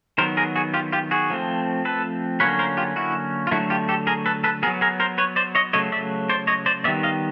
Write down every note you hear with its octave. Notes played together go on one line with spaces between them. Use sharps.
D#3 F#3 B3 A#4 C5
G#4 A#4
F#4 G#4
F4 G4
F4 G4
F#4 G#4
F3 A3 C4
A4 B4
D3 F#3 A#3 C#4 B4 C#5
A#4 C5
F4 G4
E4 F#4
F4
D3 F#3 A3 E4 F#4
F4 G4
G4 A4
G#4 A#4
A4 B4
A4 B4
F#3 B3 G#4 A#4
G#4 A#4
A#4 C5
B4 C#5
C5 D5
C#5 D#5
C#3 F#3 A3 C#5 D#5
D5 E5
C5 D5
C#5 D#5
C5 D5
D#3 G3 B3 D5 E5
D#5 F5